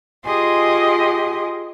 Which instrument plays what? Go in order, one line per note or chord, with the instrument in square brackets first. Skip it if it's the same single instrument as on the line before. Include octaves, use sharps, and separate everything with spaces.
[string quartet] F4 G4 G#4 D#5 G#5 C6